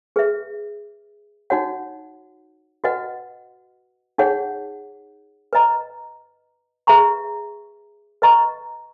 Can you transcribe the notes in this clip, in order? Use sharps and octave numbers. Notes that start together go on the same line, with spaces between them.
G#4 B4 E5
D#4 F#4 C#5 F#5
F#4 B4 D#5 F#5
D#4 G#4 C#5 F#5
B4 D#5 A#5
G#4 B4 E5 A#5 C#6
B4 D#5 A#5 C#6